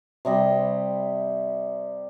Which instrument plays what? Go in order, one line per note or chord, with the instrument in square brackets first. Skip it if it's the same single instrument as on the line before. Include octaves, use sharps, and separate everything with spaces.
[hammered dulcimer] C3 G3 D#5 B5